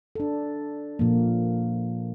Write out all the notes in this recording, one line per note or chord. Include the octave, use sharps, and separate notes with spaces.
D4 A4
A#2 F3 A#3